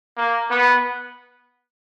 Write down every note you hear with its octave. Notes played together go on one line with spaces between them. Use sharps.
A#3
B3